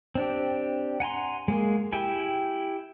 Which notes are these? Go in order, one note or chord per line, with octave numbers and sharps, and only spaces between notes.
C4 D4 G4
F#5 G#5 A#5 C6
G#3 A#3 G#4
E4 G4 G5 G#5